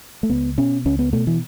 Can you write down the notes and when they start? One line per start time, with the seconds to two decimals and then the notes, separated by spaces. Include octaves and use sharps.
0.23 A3
0.30 C#2 B3
0.58 B2 C#4
0.85 C#2 C#4
0.99 B3
1.13 B2 A3
1.27 E3